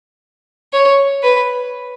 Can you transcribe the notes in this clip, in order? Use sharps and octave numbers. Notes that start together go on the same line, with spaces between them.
C#5
B4